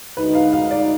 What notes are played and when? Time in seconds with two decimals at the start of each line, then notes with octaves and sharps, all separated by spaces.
0.17 D2 D3 G#3 D#4 F#4 B4
0.35 F5
0.53 F5
0.71 D5